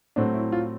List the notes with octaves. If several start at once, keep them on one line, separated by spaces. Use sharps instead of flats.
A2 F#3 A3 C4 D4
E4
F4